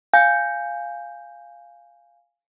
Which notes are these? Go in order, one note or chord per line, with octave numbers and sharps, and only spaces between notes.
F5 G#5 G6